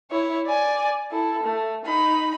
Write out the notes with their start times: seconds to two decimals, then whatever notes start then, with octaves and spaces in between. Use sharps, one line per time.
0.11 E4 C#5
0.46 D5 G#5
1.11 E4 A4
1.43 A3
1.85 D#4 B5